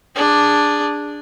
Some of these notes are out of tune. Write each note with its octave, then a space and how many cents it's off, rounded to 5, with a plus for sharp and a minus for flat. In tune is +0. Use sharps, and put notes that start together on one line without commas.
D4 +0 G#4 -15